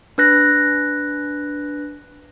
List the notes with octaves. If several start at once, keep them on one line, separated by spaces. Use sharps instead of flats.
D4 B4 F#6 A#6